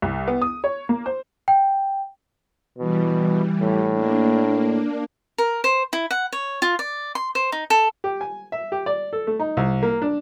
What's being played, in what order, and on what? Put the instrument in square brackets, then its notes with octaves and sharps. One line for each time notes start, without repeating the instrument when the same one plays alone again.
[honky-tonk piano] C2
B3
D#6
C#5
A#3
C5
[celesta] G5
[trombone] B2 [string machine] E3 G3
[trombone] A2
[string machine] A#3 D4
[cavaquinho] A#4
C5
E4
F#5
C#5
F4
D5
C6
C5
D#4
A4
[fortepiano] G4
G#5
E5
G4
D5
A4
A3
D#4
C2
A#3
D4